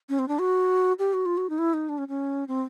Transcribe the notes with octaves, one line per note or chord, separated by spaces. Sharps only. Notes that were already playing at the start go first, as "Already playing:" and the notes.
C#4
C4
D4
F#4
G4
F#4
F4
F#4
D#4
E4
D#4
D4
C#4
C#4
C4